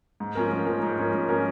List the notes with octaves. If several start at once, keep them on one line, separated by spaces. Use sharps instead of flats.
G#2
F3 C#4 A#4
G#2
F3 C#4 A#4
G#2
F3 C#4 A#4
G#2
F3 C#4 A#4